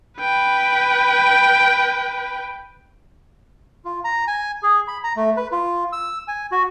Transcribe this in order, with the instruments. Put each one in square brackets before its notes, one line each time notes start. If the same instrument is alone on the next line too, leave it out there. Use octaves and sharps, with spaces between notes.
[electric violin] B4 G5
[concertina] F4
A#5
G#5
G#4
B5
A#5
A3
B4
F4
E6
G#5
F#4